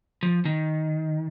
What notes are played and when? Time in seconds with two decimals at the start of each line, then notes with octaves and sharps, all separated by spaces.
0.23 F3
0.45 D#3